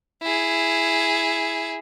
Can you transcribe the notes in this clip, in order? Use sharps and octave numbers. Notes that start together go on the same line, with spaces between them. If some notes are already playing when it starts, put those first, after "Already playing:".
E4 G#4